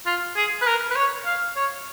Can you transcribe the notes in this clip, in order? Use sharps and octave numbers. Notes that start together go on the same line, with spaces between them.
F4
G#4
B4
A#4
B4
C#5
F5
C#5